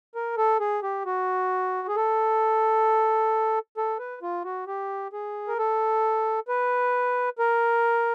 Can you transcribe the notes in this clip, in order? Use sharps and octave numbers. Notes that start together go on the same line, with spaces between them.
A#4
A4
G#4
G4
F#4
G#4
A4
A4
B4
F4
F#4
G4
G#4
A#4
A4
B4
A#4